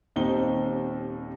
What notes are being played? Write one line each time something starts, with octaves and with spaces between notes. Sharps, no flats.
D#1 D#2 C4 D#4 G7